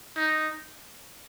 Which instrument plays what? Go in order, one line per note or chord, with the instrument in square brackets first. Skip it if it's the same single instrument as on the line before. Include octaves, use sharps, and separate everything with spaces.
[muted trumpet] D#4